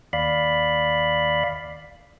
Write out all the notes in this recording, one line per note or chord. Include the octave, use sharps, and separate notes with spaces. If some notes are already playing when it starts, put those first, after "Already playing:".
D#2 D5 F5 B5